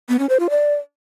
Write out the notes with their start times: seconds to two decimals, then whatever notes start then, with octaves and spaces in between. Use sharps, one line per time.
0.09 B3
0.19 C#4
0.29 C5
0.40 F4
0.50 D5